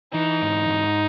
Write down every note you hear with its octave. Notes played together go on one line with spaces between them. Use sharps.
E3 D#4
G#2
G#2